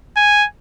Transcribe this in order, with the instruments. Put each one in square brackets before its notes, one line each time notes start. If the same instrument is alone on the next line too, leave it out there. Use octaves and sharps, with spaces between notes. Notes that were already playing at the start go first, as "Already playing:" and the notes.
[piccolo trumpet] G#5